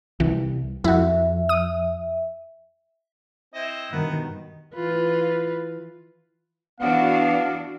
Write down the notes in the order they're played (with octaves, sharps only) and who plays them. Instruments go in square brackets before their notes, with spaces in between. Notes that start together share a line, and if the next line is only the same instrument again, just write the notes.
[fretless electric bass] C2 [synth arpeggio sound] E3
[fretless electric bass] F2 [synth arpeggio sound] E4 F#4 [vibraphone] E5
[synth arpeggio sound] D#6
[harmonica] C4 E4 D#5
[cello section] G2 B2 D#3 [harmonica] B3
[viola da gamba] E3 F4 B4
[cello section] E3 D4 F#4 [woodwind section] B3 [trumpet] F5